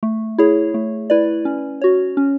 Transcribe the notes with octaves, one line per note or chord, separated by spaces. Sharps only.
A3
E4 G#4 C#5
A3
E4 B4 D5
C#4
F#4 C#5
C#4